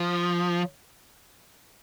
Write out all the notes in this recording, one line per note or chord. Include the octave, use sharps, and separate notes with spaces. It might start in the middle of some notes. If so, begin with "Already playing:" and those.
Already playing: F3